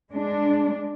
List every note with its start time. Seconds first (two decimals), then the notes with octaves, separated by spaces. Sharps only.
0.12 G#3 D4